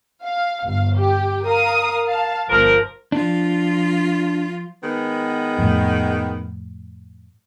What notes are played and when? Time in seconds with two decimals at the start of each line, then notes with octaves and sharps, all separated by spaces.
0.22 F5
0.65 G1 F5
0.96 G4
1.45 A#4 F5 D#6
2.06 F5 A5
2.50 G1 F3 A#4
3.12 F3 D4 F4
4.83 D#3 G#3 B3
5.58 F2 A2